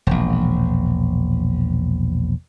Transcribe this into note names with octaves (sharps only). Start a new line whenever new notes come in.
E1 A#1